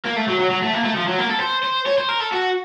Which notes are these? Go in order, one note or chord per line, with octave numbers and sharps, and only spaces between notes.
A#3
A3
F#3
F#3
F#3
A3
A#3
A3
F3
F#3
A#3
A4
C5
C5
C#5
C5
A#4
A4
F#4